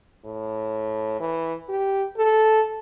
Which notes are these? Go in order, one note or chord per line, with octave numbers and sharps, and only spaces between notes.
A2
E3
G4
A4